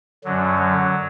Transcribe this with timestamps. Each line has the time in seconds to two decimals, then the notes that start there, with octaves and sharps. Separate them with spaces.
0.25 F#2 D3 F#3
0.59 F#3